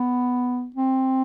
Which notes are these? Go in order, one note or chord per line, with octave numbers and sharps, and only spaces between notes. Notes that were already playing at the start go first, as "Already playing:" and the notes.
Already playing: B3
C4